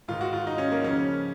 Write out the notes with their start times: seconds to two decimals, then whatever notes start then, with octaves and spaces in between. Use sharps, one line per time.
0.08 G#2 D#3 F4
0.21 F#4
0.33 F4
0.47 D#4
0.58 C#4
0.72 A#3
0.84 F2 C#3 C#4